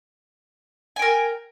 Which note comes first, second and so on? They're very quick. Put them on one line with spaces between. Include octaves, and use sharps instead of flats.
G#5 G5 A#4